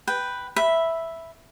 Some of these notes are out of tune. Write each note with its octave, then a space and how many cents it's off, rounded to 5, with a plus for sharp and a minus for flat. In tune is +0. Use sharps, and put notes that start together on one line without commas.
B4 +0 G5 +0
E5 +0 B5 +0